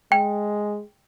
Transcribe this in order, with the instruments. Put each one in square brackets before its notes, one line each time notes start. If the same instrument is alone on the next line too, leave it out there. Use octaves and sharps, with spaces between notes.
[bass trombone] G#3 [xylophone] G5